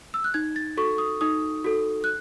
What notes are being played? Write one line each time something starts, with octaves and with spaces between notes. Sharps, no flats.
E6
F#6
D#4 G#6
A6
F#4 A4 C#6
D#6
D#4 D#6
F#4 A4
F#6